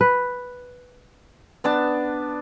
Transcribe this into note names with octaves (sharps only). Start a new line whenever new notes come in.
B4
B3 D4 A5